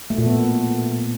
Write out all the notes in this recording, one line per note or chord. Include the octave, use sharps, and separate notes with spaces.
A3
A#2
B3